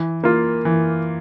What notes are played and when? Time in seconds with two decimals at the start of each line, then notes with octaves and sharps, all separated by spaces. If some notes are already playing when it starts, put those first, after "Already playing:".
Already playing: E3
0.24 A#3 F4
0.65 E3